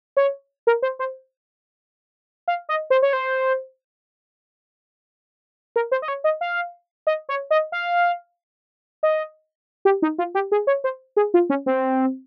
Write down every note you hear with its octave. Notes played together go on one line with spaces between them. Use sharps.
C#5
A#4
C5
C5
F5
D#5
C5
C#5
C5
A#4
C5
D#5
C#5
D#5
F5
D#5
C#5
D#5
F5
D#5
G4
D#4
F4
G4
G#4
C#5
C5
G#4
F4
C#4
C4